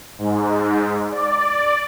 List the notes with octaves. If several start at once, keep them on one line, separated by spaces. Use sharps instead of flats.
G#2
D5